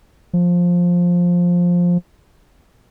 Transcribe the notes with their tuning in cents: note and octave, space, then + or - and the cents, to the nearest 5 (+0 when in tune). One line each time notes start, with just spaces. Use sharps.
F3 +10